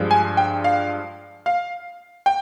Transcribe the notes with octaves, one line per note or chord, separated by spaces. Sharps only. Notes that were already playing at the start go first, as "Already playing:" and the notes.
Already playing: G2 F3 G#3
G#5
G5
F5
F5
G5